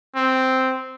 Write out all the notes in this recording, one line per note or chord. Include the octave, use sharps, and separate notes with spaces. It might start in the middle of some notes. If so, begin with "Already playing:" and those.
C4